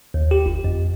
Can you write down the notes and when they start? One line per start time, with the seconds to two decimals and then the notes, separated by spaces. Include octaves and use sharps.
0.14 D#2
0.31 G4
0.46 G1
0.64 F2